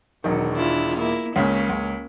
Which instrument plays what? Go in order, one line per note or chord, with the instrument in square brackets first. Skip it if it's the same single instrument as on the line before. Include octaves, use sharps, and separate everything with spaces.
[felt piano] E1 D#3 [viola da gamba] F#3
[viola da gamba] D4 E4 F4
A#3 E4
[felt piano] C#2 C#3 [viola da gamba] A#3 C#4
[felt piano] C#2